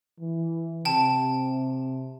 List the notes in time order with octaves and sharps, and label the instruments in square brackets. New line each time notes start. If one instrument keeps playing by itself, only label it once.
[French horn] E3
[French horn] C3 [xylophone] G5 A5